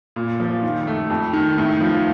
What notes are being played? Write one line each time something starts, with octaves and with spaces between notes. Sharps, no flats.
A#2
F3
D#3
A3
F2
D#3
A2
F3